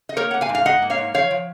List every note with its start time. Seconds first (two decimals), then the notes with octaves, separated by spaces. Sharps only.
0.09 D#5
0.16 A#3 A#4 C#5
0.31 A#3 F#5
0.41 F5 G#5
0.49 G#2
0.55 F5
0.65 G#2 D#5 F#5
0.82 A#3
0.90 C#5 F5
0.98 G#2
1.14 F3 C#5 F5
1.31 F3